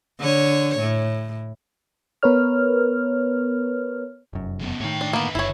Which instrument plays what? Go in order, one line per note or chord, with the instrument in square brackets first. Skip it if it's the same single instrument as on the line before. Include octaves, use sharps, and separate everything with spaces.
[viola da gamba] D3 C#5
A2
[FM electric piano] B3 A#4 B4 C#5 F6
[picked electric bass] F1 F#2
[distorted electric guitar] C#3 B3
[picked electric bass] A2 D#3 [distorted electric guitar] C#5 G5
[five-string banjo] D4
[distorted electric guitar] D3 B4 [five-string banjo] A#3 B3
[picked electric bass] F#1 [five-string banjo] E4 C#5